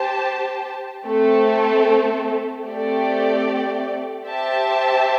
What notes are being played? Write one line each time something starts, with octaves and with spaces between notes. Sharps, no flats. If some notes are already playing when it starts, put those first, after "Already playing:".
Already playing: G4 C5 A5
A3 C4 A4
A3 C4 G4 D5
G4 C5 E5 A5